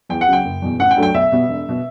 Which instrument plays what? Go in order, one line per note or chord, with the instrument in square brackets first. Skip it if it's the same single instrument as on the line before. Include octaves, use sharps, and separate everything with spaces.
[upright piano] E2 [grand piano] G5
[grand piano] F#5
[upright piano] C#3 F#3
[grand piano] G5
[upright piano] F#1
E2 B2
[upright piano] A1 [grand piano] F#5
[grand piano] G5
[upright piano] G2 F#3 A3 D4
[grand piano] G5
[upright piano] B1 [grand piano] E5
[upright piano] B2 G3 B3
E1
B2